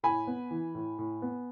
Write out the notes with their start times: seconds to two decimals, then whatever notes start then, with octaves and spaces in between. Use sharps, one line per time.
0.03 A2 G#5 B5
0.27 B3
0.51 E3
0.75 A2
0.98 A2
1.22 B3